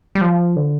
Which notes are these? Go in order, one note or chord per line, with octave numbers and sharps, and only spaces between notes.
G3
F3
D3